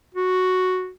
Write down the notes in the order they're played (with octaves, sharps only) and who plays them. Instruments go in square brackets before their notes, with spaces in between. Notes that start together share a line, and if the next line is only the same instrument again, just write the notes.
[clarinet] F#4